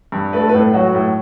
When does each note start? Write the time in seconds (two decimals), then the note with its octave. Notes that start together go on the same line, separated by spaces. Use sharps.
0.12 G2
0.33 A3 B4
0.40 A4
0.49 B4
0.54 A2
0.74 F#3 F#4
0.95 A2